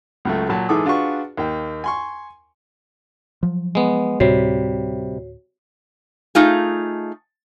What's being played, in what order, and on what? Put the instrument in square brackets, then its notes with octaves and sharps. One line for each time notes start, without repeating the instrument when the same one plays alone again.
[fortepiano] C#2 F#3 A3
A#2 F#3 A5
G#2 E3 G#4 A4 D6 D#6
D4 F4 F#4 G#4 B4 C#6
D#2 A#3 G5
G#5 C6 C#6
[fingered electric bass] F3 F#3
[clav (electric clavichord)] G#3 B3
[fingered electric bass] D2 A2 [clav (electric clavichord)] C3 G3 [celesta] F#4 C#5 C7
[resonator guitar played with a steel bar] A3 D#4 F4 G#4